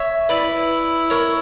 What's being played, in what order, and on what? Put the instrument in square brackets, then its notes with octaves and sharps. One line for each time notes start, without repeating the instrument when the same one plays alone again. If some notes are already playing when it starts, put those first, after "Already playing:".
Already playing: [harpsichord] C#5 E5
[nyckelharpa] E4 [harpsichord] B4 D5
[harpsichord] A#4 C#5